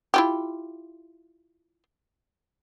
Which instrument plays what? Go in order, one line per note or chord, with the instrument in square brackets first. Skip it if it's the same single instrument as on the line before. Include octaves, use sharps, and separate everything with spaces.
[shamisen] E4 F4 G4